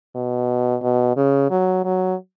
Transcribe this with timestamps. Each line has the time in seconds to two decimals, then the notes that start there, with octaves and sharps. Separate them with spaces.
0.15 B2
0.82 B2
1.17 C#3
1.50 F#3
1.84 F#3